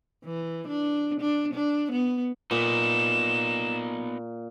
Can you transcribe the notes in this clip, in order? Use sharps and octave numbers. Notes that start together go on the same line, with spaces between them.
E3
D4
D4
D4
B3
A#2 B3 D#4 E7